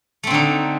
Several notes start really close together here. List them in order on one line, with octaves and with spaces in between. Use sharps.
A3 C4 D3 D#4